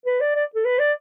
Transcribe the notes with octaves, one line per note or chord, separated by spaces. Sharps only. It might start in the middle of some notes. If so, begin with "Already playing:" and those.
B4
D5
D5
A4
B4
D5